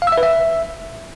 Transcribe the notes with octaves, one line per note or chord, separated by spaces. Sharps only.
F5
E6
E5
B4
E5